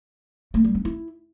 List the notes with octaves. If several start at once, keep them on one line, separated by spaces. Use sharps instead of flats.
A3
G3
D4
E4